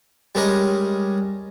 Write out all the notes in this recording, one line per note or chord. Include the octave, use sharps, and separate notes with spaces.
G3 G#3 C#4 A#4 D#5